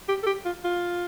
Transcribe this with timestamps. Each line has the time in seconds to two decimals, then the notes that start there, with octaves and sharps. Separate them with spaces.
0.09 G4
0.23 A4
0.27 G4
0.45 F4
0.64 F4